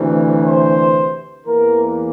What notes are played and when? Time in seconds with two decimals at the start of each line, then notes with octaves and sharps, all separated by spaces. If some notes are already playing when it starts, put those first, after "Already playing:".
Already playing: D2 C3 E3
0.47 C5
1.47 E2 E3 A#3 A#4